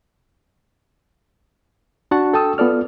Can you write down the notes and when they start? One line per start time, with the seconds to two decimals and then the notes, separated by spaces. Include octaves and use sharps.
2.11 D4 F#4 F#5 A5 C#6
2.33 A4 G5 A5 D#6 E6
2.58 B3 F4 A4 D5 F6